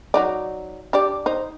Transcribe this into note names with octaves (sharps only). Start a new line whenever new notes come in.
F#3 D#4 D5
D4 G4 D5
D#4 C5